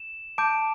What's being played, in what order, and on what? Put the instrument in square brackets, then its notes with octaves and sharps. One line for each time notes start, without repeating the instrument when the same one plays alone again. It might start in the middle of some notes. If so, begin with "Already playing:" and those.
Already playing: [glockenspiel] E7
A5 D6 G6 D7